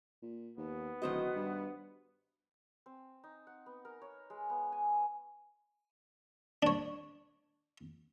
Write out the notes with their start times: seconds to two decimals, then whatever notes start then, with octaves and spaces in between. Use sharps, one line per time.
0.22 A#2
0.57 D#2 B3
1.02 D1 D#3 F#4 C5 D#5
1.35 G2
2.86 C4
3.24 D#4
3.47 F#5
3.66 B3
3.85 A#4
4.02 C#5
4.30 G#3
4.50 B3
4.72 G#5
6.63 D4 C#5